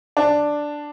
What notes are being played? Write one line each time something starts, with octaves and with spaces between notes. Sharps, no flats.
D4